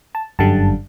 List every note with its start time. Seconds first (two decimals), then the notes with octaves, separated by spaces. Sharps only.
0.15 A5
0.39 G1 F#2 D3 G3 A5